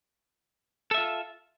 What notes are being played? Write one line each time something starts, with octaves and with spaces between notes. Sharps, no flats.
F4 A4 E5